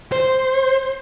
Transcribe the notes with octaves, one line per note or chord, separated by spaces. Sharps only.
C5